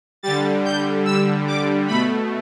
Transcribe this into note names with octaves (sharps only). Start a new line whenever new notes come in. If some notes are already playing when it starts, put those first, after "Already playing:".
D3 G3 A6
G6
E6
D6
B2 A3 B5